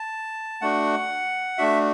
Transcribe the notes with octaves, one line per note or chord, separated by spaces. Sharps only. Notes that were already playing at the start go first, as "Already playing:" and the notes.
Already playing: A5
A3 D4 F#4 F#5
A3 D4 F#4 E5